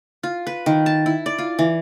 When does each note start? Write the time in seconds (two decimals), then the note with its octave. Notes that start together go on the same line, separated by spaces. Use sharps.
0.23 F4
0.47 B4
0.66 D#3
0.86 A5
1.06 E4
1.26 D5
1.38 F4
1.59 E3